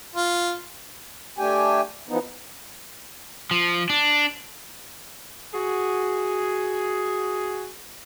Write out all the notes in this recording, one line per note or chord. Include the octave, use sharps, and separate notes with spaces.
F4
A3 D4 G4 G5 G#5
E3 F3 B3 D#4
F3
D4
F#4 G#4